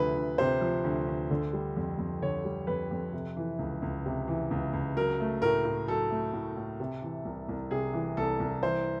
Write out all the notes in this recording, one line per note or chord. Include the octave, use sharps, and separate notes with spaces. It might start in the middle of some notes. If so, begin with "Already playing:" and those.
Already playing: D2 C3 F3 B4
D2
C3 C5
F3
D2
D2
D3
G3
F2
F2
D3 C#5
G3
F2 B4
F2
C3
E3
C#2
C#2
C3
E3
C#2
C#2
F#3 A#4
A3
A2 A#4
A2
F#3 A4
A3
A2
A2
C3
E3
C2
C2
C3 G#4
E3
C2 A4
C2
E3 C5